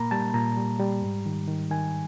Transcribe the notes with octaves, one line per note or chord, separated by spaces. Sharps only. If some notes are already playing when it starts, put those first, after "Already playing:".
Already playing: A#2 A#3 A#5 B5
G3 A5
A#2 A#5
G3
G3
G#2
D#3
D#3
D#3 G#5